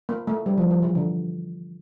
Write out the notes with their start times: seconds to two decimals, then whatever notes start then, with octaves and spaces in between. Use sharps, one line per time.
0.09 A#3
0.27 A3
0.46 G3
0.58 F3
0.71 F3
0.82 E3
0.95 D3